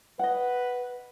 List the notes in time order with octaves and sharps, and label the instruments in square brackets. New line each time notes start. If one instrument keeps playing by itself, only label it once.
[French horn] B4 [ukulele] D#5 F#5